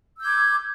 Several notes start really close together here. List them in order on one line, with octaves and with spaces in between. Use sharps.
E6 G6 D6 G#6